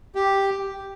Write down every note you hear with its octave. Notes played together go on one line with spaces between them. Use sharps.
G4